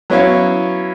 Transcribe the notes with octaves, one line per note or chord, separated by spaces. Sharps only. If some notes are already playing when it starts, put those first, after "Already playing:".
F#3 B3 C#4 E4 C#5 F5